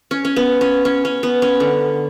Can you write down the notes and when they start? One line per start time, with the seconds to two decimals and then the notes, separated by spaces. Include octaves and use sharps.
0.11 C#4
0.25 C#4
0.36 B3
0.61 C#4
0.85 C#4
1.05 C#4
1.23 B3
1.42 C#4
1.60 D3